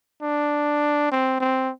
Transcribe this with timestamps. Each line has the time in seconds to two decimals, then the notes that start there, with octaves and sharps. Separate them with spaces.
0.22 D4
1.12 C4
1.40 C4